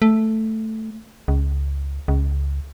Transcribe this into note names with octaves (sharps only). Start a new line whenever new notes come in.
A3
C#2
C#2